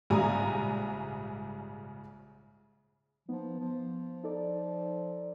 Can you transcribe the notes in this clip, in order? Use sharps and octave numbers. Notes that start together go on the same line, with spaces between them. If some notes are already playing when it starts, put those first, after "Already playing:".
A#1 G#2 C#3 G3 G#5 A#5
F3 B3 D#4
F3
D#4 A4 D5